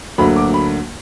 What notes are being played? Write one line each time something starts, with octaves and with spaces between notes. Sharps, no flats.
D2 D3 F#3 A#3 B5
D6
B5